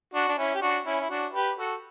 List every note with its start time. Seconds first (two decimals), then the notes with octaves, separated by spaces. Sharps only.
0.14 D4 F#4
0.28 D4
0.38 C#4 E4
0.55 G4
0.62 D4 F#4
0.86 C#4 E4
1.01 E4
1.10 D4 F#4
1.33 G4 B4
1.57 F#4 A4